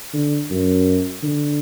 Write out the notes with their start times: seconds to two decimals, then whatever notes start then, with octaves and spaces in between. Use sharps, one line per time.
0.14 D3
0.50 F#2
1.23 D3